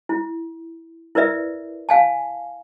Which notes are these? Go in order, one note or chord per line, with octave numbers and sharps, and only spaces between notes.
E4
E4 A#4 B4 D5 E5
F5 G#5 A5